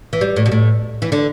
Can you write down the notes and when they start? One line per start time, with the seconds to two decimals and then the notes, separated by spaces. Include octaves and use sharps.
0.13 E3
0.21 G3
0.36 A2
0.46 B2
0.52 A2
1.02 E3
1.12 D3